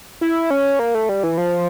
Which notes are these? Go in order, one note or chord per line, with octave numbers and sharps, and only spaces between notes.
E4
C#4
A#3
A3
G3
E3
F3